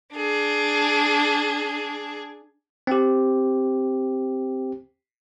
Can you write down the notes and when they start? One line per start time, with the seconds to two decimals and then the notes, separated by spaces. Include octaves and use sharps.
0.14 D4 G#4
2.87 C4 G4